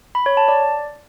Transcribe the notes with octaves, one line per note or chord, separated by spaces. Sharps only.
B5
C#5
A5
D5